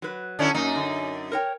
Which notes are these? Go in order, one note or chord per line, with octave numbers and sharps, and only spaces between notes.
F#3 B4
D3 C#4 E4
F#2 A#3 D#4
D3
A#4 C#5 G5